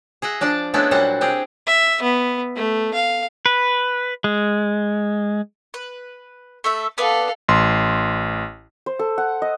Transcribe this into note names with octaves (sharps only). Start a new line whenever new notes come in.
G#4 D#5 E5 F#5
F3 D4 D5 A5
G#3 A3 B3 C#4 D4 E4
A#2 F#3 G3 C5 F#5
C4 G4 G#4
E5
B3
A3
F5
B4
G#3
B4
A3 A4 E5
B3 A4 B4 D5 F5
A1 C6
C5
A4
F#5
D#5